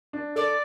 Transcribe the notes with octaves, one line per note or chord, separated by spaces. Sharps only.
D4
A4 D5